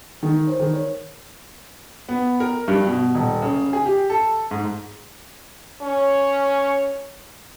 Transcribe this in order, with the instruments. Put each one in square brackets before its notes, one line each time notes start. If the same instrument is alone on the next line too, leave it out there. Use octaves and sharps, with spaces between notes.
[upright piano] D#3
C5
D#3
C#5
B3
A#4
G2
B2
D#1
C#3
G#4
G4
A4
G#2
[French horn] C#4 [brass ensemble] C#5